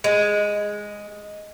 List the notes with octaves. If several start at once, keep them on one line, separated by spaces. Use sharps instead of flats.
G#3